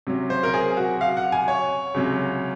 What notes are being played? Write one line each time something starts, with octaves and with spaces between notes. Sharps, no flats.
C3 F#3 C#4
C5
A#4
G#4
F#4
F5
F#5
G#5
C#5
C#2 C3 F#3 C#4